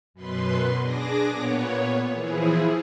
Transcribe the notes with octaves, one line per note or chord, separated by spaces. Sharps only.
F#2 B2 B4 C6
D4 G#4 D6 A#6
A#2 B3 C#5
E3 F3 E4 G#4